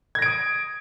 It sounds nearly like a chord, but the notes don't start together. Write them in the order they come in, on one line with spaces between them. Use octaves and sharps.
G#6 A#6 D7 D#6